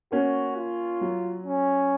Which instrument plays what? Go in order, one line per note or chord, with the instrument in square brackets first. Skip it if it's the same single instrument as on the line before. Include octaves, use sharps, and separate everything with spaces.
[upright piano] A#3 C#4 [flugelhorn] F#4
[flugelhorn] F4
[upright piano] F#3
[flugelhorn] C#4